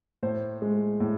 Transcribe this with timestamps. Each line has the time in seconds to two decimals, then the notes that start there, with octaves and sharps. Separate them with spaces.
0.23 A2 C5
0.62 G#3
1.00 A2